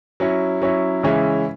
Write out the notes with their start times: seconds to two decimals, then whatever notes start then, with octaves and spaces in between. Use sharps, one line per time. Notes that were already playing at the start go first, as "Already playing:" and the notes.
0.20 F#3 C#4 E4
0.62 F#3 C#4 E4
1.03 C#3 E3 G#3 C#4 E4